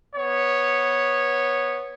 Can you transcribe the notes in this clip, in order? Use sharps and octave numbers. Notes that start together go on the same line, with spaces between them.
B3 C#5